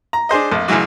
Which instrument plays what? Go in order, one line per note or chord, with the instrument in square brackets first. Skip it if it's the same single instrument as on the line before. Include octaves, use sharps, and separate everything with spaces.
[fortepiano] A#5
D4 G#4 C5 D#5
A#1 F2
A1 C#3 E3 F#3 F#4